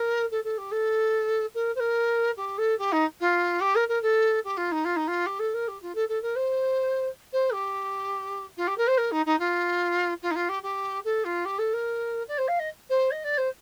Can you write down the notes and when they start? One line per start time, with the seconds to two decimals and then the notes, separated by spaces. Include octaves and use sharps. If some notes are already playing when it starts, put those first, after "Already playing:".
Already playing: A#4
0.31 A4
0.44 A4
0.57 G4
0.71 A4
1.54 A#4
1.75 C5
1.79 A#4
2.36 G4
2.58 A4
2.78 G4
2.92 D#4
3.20 F4
3.60 G4
3.75 A#4
3.88 A#4
4.02 A4
4.44 G4
4.57 F4
4.71 D#4
4.84 F4
4.96 D#4
5.07 F4
5.26 G4
5.39 A4
5.54 A#4
5.68 G4
5.82 F4
5.95 A4
6.08 A4
6.22 A#4
6.35 C5
7.32 C5
7.53 G4
8.57 F4
8.67 G4
8.77 A#4
8.87 C5
8.97 A#4
9.11 D#4
9.26 D#4
9.39 F4
10.22 F4
10.31 D#4
10.35 F4
10.49 G4
10.62 G4
11.04 A4
11.24 F4
11.45 G4
11.58 A4
11.73 A#4
12.27 D5
12.38 C5
12.48 F5
12.59 D#5
12.89 C5
13.11 D#5
13.24 D5
13.37 C5